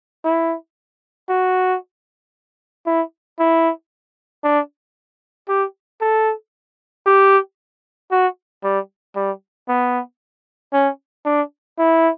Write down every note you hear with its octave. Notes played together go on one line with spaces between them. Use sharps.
E4
F#4
E4
E4
D4
G4
A4
G4
F#4
G3
G3
B3
C#4
D4
E4